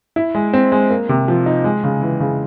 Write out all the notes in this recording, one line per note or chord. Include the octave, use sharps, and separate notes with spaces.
E4
G#3
C4
G#3
A#3
C3
F3
D#4
G#3
C#3
E3
C#3